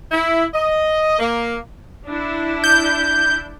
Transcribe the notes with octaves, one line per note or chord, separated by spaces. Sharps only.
E4
D#5
A#3
D4 E4
G6